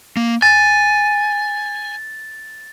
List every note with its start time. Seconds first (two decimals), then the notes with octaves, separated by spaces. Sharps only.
0.17 A#3
0.42 G#5 A6